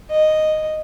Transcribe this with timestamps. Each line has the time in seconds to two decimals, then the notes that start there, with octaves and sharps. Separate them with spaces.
0.11 D#5